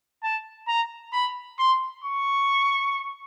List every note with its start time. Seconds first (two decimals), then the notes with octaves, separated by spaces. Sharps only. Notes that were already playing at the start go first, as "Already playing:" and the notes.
0.23 A5
0.68 A#5
1.13 B5
1.59 C6
2.04 C#6